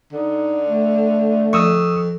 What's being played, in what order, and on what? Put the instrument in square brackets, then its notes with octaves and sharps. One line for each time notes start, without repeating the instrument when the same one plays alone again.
[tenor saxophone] D3 [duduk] D#4
[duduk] A3
[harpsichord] F2 [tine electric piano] C#6 D#6 E6